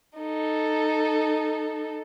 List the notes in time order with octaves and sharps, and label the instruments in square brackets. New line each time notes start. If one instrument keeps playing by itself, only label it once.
[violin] D#4 A4